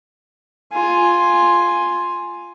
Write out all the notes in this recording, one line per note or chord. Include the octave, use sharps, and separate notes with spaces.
F4 G#5